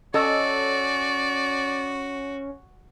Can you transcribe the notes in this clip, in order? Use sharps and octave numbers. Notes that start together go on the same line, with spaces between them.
C#4 F#4 A4 D5 D#5